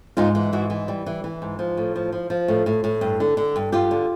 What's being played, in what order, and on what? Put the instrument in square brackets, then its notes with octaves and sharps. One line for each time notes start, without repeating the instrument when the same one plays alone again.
[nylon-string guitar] G#2 D#4 F4
E3
G#2 E4 F#4
E3
G3
E3
E3
G#2
F3
A2
F3
F3
F3
A2
A2
A2
G2
D3
D3
G2
G2 F4 G4
D3